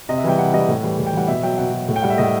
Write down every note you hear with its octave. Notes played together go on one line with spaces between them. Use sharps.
C3 D#5
E5
E3 G3 G5
C3 F#5
E3 G3 D#5
A2
E3 G3
A2
G5
E3 G3 F#5
B2 E5
F#3 G5
B2 F#5
F#3
A2
G5
G3 F#5
E5
A2 D#5